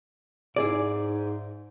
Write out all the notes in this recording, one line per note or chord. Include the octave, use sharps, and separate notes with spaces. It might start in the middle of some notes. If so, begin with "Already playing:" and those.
G#2 E4 G#4 D5